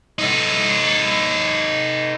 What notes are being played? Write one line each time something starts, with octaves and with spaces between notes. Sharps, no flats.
D#4 A4